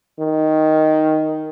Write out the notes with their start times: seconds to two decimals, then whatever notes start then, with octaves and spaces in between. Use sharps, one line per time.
0.19 D#3